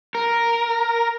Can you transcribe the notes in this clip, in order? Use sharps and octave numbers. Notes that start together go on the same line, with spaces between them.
A#4